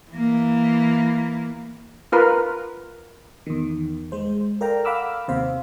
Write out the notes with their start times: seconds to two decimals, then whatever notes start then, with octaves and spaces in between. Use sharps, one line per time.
0.11 E3 A#3
2.12 F4 A#4 B4
3.47 E2 D#3
4.12 G#3 C5
4.61 A4 A#4 D5 F5 G5 A#5
4.85 F5 F#5 B5 D6 E6 F6
5.28 D#2 C3 C5 F5